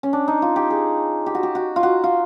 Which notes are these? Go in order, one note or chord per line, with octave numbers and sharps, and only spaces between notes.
C#4
D4
D#4
F4
G4
G#4
G4
F#4
G4
F#4
F4
F#4
F4